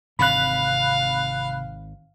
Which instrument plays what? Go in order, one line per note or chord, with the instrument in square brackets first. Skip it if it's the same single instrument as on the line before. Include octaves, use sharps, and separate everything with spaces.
[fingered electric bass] G#1 [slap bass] C3 E3 C4 [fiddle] F5 [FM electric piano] B5 F#6